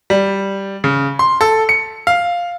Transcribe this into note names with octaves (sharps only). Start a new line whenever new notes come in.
G3
C#3
C6
A4
C#7
F5